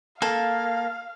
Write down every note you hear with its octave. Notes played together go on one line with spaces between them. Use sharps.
A#3 A4 F5